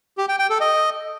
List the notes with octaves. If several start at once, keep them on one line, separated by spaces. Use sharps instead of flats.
G4
G5
G5
A4
D#5